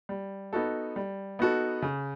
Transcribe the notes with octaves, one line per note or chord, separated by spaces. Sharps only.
G3
B3 D#4 F#4 A4
G3
B3 D#4 F#4 A4
C#3